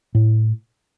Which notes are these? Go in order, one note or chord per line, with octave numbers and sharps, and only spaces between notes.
A2